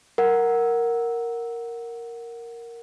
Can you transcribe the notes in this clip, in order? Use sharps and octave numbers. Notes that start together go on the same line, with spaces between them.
A#4 F#5